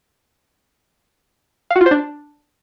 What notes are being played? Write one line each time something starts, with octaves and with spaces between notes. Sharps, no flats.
F5
F#4
F4
C5
D4